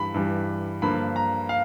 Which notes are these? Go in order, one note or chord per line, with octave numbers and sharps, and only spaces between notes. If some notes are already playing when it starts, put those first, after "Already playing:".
Already playing: G2 E3 G3 B5
G2 E3 G3
G2 D3 F3 A#3 B5
A#5
F5